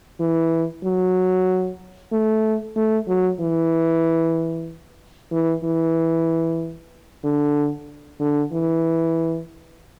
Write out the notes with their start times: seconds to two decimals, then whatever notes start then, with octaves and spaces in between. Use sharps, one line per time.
0.20 E3
0.84 F#3
2.12 A3
2.76 A3
3.08 F#3
3.40 E3
5.32 E3
5.64 E3
7.24 D3
8.20 D3
8.52 E3